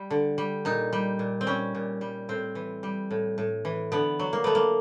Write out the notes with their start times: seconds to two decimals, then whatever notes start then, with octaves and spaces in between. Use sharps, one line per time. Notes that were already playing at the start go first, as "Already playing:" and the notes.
Already playing: G3
0.10 D3
0.38 G3
0.65 A#2 D#4
0.93 G3
1.19 A#2
1.41 C4
1.47 G3 C#4
1.75 A#2
2.01 G3
2.29 A2 C4
2.55 E3
2.83 G3
3.11 A2
3.38 A2
3.65 E3
3.92 D3 B3
4.19 F#3
4.33 A#3
4.44 A3 B3
4.55 A#3